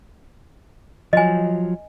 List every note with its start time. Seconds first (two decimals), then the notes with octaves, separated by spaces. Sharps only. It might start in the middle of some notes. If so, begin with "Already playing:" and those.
1.13 F3 F#3 D#5 G#5